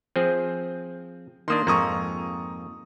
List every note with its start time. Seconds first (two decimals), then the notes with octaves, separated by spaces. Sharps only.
0.16 F3 C4 G#4
1.48 D#3 A#3 D4 C6 D#6
1.67 F2 G#2 A#3 A#5 C#6 D#6